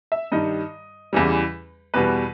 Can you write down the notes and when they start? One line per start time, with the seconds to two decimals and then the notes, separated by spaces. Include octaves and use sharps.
0.12 E5
0.32 G2 D#3 G3 D#5
1.13 E2 C#3 E3 G3
1.94 E2 B2 G3 B4